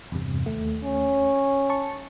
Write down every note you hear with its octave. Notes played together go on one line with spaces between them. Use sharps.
E2 G2 C3
D#2 A3
C#4
A5 C#6